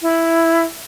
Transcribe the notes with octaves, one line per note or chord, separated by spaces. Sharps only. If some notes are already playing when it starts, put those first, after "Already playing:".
E4